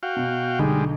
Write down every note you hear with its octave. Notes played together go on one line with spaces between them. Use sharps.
F#4 F5 G5
B2
B1 D3 G3 G#3